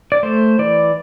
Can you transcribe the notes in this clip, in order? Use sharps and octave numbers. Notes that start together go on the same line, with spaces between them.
D5
A3 C5
E3 D5